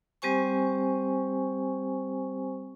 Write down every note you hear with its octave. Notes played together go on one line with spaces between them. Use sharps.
G3 C4 G4 C5 G#5 C#6